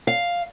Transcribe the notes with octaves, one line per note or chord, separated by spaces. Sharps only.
F5